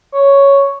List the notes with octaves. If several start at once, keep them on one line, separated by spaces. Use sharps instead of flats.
C#5